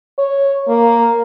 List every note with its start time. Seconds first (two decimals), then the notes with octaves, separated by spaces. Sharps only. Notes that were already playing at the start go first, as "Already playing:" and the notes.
0.18 C#5
0.68 A#3